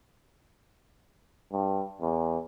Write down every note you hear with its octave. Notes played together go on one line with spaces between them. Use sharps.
G2
E2